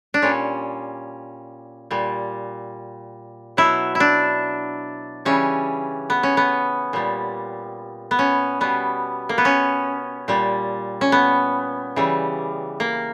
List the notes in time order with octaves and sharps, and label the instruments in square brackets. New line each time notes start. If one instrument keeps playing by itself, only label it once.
[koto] D4
A#2 G3 C#4
A#2 G3
B2 F#3 E4
E4
D4
C#3 E3 G3 C#4
B3
C#4
B3
A#2 G3
B3
C#4
B2 G3 B3
A#3
B3
C#4
A#2 G3
C#4
B3
C#3 E3 G3
A#3